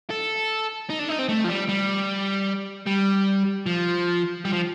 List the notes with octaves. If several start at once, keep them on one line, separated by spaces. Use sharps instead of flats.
A4
D#4
D4
D#4
C4
A3
F3
G3
G3
G3
F3
G3
F3